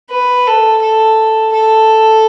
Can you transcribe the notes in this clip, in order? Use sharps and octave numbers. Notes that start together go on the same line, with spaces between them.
B4
A4
A4
A4